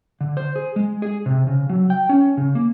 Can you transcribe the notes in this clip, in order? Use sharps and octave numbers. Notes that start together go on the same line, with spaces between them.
D3
C5
G#4
G#3
G#4
C3
C#3
F#3
G5
C#4
C#3
A#3